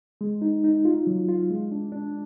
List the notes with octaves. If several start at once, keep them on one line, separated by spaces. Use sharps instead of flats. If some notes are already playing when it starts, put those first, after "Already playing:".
G#3
D#4
D#4
F4
F#3
F4
G#3
D4
D4